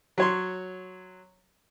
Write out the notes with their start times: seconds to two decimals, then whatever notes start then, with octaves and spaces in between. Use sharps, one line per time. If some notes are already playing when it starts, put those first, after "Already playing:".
0.18 F#3 C#5 C6